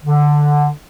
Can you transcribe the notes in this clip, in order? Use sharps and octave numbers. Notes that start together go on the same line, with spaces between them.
D3